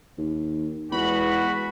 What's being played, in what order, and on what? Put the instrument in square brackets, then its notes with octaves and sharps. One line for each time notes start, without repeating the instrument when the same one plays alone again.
[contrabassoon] D#2
[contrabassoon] E2 [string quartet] G#3 B4 [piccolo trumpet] F#4 [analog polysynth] B5